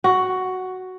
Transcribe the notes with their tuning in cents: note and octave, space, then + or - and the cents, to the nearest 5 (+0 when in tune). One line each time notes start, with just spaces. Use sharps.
F#4 +5